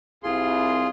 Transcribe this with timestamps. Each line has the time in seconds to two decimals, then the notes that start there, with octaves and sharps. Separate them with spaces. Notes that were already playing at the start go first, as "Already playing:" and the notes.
0.23 C2 F4 G#4 C6